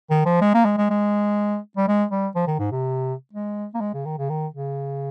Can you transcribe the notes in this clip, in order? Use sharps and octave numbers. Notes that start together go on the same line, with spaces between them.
D#3
F3
G#3
A#3
G#3
G#3
G#3
G3
G#3
G3
F3
D#3
G#2
C3
G#3
A#3
G#3
C#3
D#3
C#3
D#3
C#3